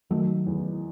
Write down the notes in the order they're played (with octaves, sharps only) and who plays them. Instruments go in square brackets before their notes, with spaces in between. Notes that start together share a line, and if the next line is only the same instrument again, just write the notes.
[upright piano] D#3 [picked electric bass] F#3 A3
[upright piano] E2